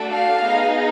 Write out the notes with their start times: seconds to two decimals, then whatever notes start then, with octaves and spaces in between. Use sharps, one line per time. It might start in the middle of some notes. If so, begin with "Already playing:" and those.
Already playing: A3 D4 F#4 A4
0.10 F5
0.43 B3 D#4 G#4